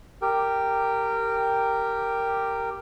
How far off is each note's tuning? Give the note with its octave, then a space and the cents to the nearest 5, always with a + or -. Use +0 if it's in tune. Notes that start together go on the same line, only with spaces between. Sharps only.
G4 +0 A#4 -15 G5 +0